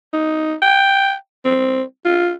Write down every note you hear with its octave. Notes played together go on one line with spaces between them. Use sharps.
D#4
G5
C4
F4